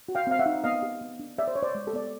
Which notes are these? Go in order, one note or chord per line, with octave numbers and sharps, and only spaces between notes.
F#4
F5 G5
C4 F5
E5 F#5
D#4
B3 D#5 F5
G4
B3
D4
G4 D5 E5
C5
D4 C#5
C5 D5
G#3
G4 A4
B3 D5